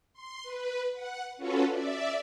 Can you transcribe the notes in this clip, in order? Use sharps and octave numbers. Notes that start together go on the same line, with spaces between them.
C6
B4
F#5
C#4 F4 F#4 A4 B4
D5 E5